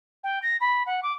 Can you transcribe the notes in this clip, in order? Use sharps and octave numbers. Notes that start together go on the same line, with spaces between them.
G5
A#6
B5
F#5
D6